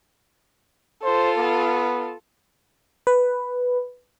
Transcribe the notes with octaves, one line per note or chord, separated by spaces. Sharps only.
F4 A4 C5
B3
B4